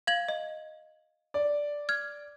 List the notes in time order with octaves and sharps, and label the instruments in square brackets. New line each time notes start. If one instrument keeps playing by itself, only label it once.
[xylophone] F5 G#6 F#7
D#5
[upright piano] D5
[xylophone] F6 G#6